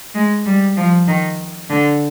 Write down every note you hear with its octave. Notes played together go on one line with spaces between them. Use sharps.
G#3
G3
F3
D#3
D3